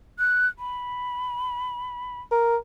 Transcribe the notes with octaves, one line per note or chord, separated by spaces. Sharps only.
F#6
B5
A#4